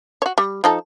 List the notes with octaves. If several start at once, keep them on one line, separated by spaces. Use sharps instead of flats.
F#4 C#5
G3
F3 D#4 A4